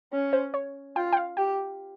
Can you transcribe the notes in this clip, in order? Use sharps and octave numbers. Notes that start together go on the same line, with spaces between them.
C#4
C5
C#5
F4 G5
G5
F5
G4 G5